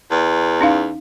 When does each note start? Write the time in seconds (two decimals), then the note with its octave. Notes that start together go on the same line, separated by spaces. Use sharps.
0.11 E2
0.61 C#4 D#4 F5